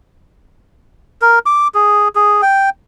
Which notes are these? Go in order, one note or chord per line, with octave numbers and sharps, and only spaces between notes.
A#4
D6
G#4
G#4
G5